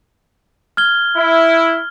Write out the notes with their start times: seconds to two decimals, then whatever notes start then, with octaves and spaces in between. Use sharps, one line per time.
0.77 F6 G#6 G7
1.17 E4